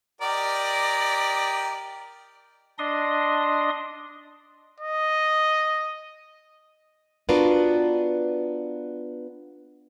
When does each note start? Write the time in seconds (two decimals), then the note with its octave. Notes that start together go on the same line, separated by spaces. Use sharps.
0.21 G4 A#4 D5 D#5
2.79 D4 D#5 C6 D#6
4.80 D#5
7.29 B3 D4 F4 F#4 A#4 B4